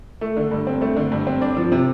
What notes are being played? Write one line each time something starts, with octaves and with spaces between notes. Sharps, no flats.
A3
D3
G2
C4
A3
D3
G2
C4
D4
F3
C3